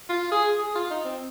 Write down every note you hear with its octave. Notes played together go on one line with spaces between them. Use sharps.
F4
G#4
G#4
F4
D#4
C4